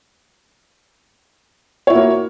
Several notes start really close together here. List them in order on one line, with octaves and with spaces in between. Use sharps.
C#5 E4 F#4 A#3